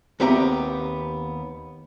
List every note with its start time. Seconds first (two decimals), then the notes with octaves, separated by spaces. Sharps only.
0.20 D#2 B3 C4 G4 E5 A#5